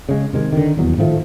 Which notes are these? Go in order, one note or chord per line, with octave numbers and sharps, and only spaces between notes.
C#3 G#3
C3 D#3 G#3
D3 D#3
D#1 E2 F#3
A2 D#3 F3 A3